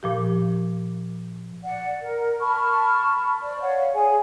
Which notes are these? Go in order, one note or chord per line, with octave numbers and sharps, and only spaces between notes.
A#2 F3 G4
D5 F#5
A#4
A5 B5 C#6 F6
C5 D5
C#5 F5 F#5
G#4 G#5